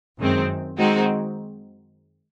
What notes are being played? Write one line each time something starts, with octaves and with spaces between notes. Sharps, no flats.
F#2 D#3 G#3 C4
D#3 G#3 C4 D#4 F#4